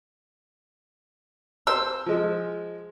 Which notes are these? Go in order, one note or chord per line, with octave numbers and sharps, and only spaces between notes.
C5 E6
F3 G#3